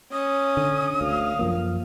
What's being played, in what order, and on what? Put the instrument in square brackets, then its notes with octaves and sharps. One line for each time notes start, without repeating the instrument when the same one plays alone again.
[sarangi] C#4 [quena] D#6
[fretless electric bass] D3
[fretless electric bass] D2 [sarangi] F5
[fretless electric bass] F#2 F3 A#3